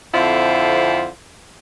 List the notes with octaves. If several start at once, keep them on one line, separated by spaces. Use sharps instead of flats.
F2 D3 C4 E4 F4 C5